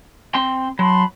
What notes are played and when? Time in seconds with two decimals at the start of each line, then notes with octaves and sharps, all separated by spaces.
0.35 C4 C6
0.79 F#3 A5 B5 C6